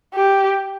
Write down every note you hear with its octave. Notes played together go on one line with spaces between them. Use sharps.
G4